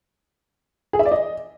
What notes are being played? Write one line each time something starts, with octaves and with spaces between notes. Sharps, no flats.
G#4
E5
D5
D#5